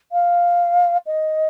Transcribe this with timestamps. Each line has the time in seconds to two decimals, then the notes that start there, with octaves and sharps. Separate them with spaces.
0.12 F5
1.06 D#5